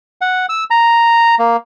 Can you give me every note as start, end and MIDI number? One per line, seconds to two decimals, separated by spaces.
0.21 0.46 78
0.49 0.64 88
0.70 1.35 82
1.39 1.56 58